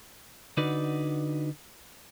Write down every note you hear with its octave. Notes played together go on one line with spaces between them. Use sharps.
D3 D#4 F#4 B4 D5